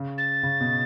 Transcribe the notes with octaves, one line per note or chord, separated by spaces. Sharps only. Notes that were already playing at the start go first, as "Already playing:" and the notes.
Already playing: C#3
A6
C#3
B2